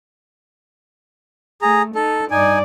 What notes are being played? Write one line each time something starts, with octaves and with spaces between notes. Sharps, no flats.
A3 G#4 A#5
D#4 A4
G2 D#4 D5 G#5